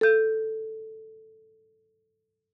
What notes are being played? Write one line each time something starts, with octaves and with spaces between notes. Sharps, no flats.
A4 G6